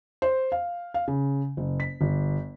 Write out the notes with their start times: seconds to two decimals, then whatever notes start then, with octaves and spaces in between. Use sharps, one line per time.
0.22 C5
0.52 F5
0.94 F5
1.08 C#3
1.57 F#1
1.80 B6
2.01 G1